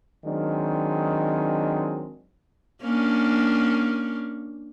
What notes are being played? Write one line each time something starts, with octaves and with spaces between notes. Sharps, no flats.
D#3 F#3 G#3 C4 D4
A#3 C#4 D4